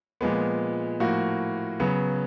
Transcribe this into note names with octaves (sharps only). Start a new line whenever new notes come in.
A#2 F3 G#3 B3
A2 F3 A#3 F#4
C#3 F#3 B3